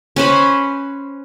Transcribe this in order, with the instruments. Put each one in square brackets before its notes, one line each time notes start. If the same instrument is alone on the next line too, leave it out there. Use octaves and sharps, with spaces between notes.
[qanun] C#4 B4 C5 B5